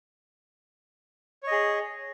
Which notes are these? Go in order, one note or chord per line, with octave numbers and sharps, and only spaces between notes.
G#4 C#5 D#5